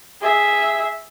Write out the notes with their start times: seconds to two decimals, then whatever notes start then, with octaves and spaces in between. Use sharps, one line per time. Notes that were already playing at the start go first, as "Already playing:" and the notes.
0.21 G#4 E5